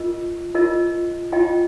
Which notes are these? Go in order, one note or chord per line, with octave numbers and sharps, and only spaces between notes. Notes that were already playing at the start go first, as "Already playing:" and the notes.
Already playing: F4 A#4 D#5
F4 A#4 D#5
F4 D#5 G5